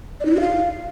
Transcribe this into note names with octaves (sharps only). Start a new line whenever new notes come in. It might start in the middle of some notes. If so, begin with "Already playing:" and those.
D5
D#4
E4
F#4
F5